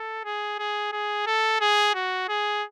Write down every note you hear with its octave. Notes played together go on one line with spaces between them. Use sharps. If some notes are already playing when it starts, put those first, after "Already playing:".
Already playing: A4
G#4
G#4
G#4
A4
G#4
F#4
G#4